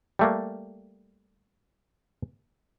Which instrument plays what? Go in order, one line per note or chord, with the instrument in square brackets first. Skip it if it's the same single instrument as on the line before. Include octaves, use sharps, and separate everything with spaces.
[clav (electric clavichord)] G3 A3 A#3